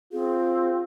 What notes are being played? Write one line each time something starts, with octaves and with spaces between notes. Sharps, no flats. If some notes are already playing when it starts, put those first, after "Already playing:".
C4 F4 G#4